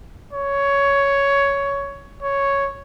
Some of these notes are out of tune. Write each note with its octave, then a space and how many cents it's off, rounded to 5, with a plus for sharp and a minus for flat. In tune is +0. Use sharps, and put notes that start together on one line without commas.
C#5 +10
C#5 +0